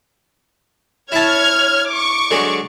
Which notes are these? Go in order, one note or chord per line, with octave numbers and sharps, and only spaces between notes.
E4 C#5 E5 A5 F6 G#6
C#6 D6
D3 F#3 G#3